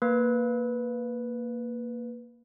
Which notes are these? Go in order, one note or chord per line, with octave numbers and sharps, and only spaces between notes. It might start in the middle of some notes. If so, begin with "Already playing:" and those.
A#3 B4